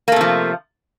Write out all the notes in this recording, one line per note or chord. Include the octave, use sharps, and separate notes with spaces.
C3 F3 A3 A#3